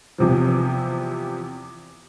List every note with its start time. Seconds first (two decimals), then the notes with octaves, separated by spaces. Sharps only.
0.18 E2 C3 F3